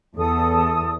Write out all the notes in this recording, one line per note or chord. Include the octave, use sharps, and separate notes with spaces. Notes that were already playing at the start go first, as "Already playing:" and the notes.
E2 A4 D#6